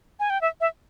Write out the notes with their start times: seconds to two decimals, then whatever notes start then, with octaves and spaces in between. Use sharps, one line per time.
0.20 G#5
0.30 G5
0.41 E5
0.61 E5